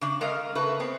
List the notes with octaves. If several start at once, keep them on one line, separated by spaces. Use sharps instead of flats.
C#3 D4
G#3 A#4 D#5 F5
C#3 A3 B4
B3 C4